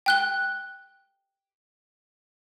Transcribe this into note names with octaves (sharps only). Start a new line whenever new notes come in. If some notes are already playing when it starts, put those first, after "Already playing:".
G5 F#6 G7